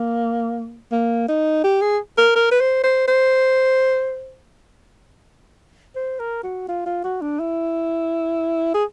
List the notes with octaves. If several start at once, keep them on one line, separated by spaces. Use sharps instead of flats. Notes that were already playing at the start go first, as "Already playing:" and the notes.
Already playing: A#3
A#3
D#4
G4
G#4
A#4
A#4
B4
C5
C5
C5
C5
A#4
F#4
F4
F4
F#4
D4
E4
G#4